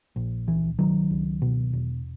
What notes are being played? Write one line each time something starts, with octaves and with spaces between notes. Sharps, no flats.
A#1
C#2 E3
C#2 D#3 F#3
C#2
B2
E1